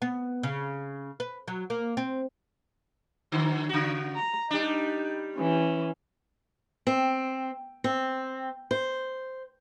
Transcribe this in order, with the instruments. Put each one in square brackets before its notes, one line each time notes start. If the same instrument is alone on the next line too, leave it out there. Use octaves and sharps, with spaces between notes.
[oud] B3
C#3
B4
F#3
A#3
C4
[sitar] D3 D#3 F#3
C#3 F#4
[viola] A#5
[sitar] G3 D4 [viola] D#4
[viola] E3 C#4
[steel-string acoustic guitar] C4
C4
C5